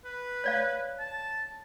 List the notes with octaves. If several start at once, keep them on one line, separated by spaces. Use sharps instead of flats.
B4
C#5 D5 F5
A5